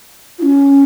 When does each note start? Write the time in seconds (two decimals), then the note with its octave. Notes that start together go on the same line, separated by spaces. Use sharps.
0.39 F4
0.43 C#4